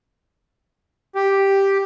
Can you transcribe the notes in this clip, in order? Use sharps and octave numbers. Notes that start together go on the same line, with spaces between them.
G4